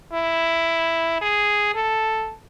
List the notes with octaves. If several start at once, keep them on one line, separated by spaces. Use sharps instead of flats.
E4
G#4
A4